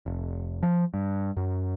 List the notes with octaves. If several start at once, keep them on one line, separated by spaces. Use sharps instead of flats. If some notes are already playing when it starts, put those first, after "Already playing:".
F1
F3
G2
F#2